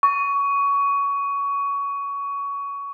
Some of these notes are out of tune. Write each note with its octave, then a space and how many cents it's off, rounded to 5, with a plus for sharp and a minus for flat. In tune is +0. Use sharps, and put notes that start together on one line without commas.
C#6 +20